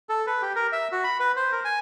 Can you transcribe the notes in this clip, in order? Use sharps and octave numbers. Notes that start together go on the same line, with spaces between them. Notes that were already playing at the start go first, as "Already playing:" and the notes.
A4
B4
G4
A#4
E5
F#4
B5
B4
C5
A#4
G#5